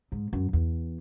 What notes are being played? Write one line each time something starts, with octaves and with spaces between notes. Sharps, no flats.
G#2
F#2
E2